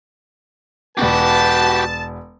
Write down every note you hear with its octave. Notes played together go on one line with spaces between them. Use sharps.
E1 B3 F#4 G4 B4 A5